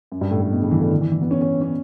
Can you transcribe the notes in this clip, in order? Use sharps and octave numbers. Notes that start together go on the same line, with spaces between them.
F#2
G2
A2
A2
B2
C#3
E3
D3
E3
E3
E3
B3
C#4
C#4
C#4